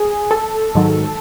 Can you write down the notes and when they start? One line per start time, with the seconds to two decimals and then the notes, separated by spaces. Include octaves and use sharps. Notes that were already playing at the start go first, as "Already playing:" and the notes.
Already playing: G#4
0.31 A4
0.75 G#2 D#3 F#3